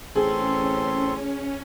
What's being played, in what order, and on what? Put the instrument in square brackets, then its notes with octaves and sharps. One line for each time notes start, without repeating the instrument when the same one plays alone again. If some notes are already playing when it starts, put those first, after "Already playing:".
[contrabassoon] A1 [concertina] C4 A4 C6 [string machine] C#4 [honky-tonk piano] G#4